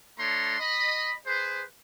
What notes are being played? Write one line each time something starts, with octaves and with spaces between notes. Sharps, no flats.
A3 D4 C#5 A#5 C6
D#5 B5
G#4 B4 C5